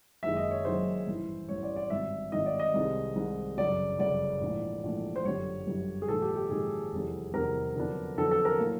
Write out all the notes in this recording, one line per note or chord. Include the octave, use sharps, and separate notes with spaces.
F#1 F#2 D#3 G#3 E5
D#5
C#5
F#1 F#2 D#3 G#3 C5
A1 G2 E3
A1 G2 E3 C#5
D5
D5
G#1 G2 D#3 E5
G#1 G2 D#3 D#5
D5
D#5
C2 C3 D#3 G#3
C2 C3 D#3 G#3
G1 F#2 C#3 D5
G1 F#2 C#3 D5
A#1 G#2 E3 A3 D4
A#1 G#2 E3 A3 D4
C5
G1 F#2 D3 G3 C#5
G1 F#2 D3 G3
G#4
A#1 G#2 D#3 A4
G4
G4
A#1 G#2 D#3 G#4
F1 E2 C3 D#3 G3
F1 E2 C3 D#3 G3 A#4
F2 D3 F#3 B3 D4
F2 D3 F#3 B3 D4 A4
A4
A#4
A2 F#3 A#3